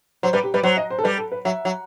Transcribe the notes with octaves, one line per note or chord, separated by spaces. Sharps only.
F#3 C5
G3 B4
G4
G3 B4
F#3 C5
D#5
C5
A4
G3 B4
A4
B4
F#3 E5
F#3